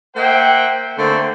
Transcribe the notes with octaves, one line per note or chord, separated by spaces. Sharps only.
A#3 C5 E5 F#5 G5
D3 A3 A#3 C4